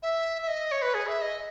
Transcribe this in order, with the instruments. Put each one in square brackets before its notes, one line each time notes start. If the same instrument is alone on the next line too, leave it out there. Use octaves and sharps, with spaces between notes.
[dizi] E5
E5
D#5
C#5
B4
G#4
E5
D#5